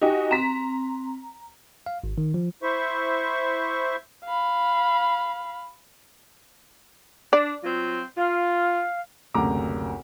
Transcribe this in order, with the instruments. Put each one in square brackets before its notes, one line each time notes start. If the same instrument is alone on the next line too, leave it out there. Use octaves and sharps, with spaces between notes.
[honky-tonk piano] D#4 F#4 G4 [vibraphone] G#5
[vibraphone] C4 [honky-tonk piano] A#5 B6
[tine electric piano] F5
G#1
D#3
F3
[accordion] E4 C5 E5 C#6
[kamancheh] F5 B5
[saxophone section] D4 [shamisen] D5
[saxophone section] F#3 C4 F4
[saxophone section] F4 [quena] F5
[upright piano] F#1 D2 C3 A#5 D6